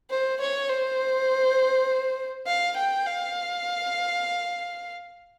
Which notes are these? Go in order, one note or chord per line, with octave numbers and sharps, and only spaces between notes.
C5
C#5
C5
F5
G5
F5